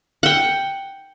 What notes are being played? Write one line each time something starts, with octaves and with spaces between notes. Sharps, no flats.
F#5 G5